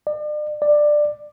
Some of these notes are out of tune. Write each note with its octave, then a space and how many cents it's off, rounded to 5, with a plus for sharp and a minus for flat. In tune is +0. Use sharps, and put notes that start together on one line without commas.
D5 +40
D5 +15